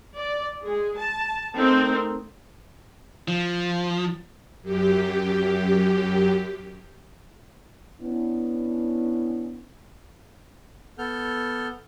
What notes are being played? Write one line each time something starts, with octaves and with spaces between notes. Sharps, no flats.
D5
G#3 G#4
A5
A3 C4 D#4 A#4 C5
F3
F#2 G4
B3 C#4 D4 E4
B3 A4 F6 G6